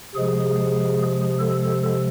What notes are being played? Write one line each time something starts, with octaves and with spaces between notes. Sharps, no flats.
C3 F3 G#3 G#4
A4